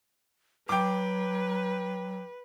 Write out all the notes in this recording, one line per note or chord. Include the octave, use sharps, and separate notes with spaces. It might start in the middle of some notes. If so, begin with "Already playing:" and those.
F#3 B4 G5 D6